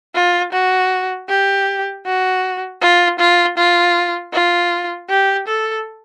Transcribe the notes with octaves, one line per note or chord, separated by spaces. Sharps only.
F4
F#4
G4
F#4
F4
F4
F4
F4
G4
A4